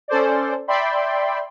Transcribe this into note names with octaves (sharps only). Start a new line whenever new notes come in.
C#4 A4 C5 D5
D5 E5 G5 B5 C6